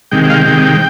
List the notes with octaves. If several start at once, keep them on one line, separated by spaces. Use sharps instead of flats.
C3 D#3 G#3 G5
G5
F5
G5
C3 D#3 G#3 G5